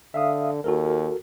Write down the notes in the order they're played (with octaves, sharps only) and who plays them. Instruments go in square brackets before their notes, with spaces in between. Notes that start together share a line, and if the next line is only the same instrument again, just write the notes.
[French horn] D3 [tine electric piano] E5 F5 D#6
[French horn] D#2 [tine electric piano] F#4 A4 A#4